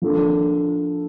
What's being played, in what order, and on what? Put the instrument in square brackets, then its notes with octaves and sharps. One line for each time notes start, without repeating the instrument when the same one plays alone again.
[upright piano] F3 A#3 D4 A4